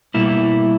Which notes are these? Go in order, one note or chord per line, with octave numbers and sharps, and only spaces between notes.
B2 G3 A#3 E4